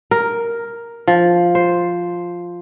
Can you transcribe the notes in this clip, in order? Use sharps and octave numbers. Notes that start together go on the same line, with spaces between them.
A#4
F3
C5